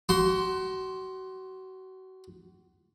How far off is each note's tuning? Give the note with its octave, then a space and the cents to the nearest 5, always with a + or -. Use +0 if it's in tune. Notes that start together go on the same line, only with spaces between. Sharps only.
F#4 +30 C6 +0